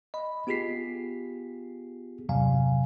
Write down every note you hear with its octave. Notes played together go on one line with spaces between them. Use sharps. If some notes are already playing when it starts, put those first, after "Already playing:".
D#5 B5
B3 F4 G4 G#4 B6 C7
E2 G2 C3 F#3 F5 G#5